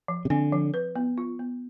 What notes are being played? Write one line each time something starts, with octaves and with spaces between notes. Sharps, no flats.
F3
C3
D3 C4
F3
B4
B3
F4
B3